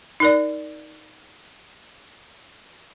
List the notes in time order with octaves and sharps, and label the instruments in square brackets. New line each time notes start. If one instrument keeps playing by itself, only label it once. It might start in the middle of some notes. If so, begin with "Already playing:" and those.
[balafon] D#4 A#4 D5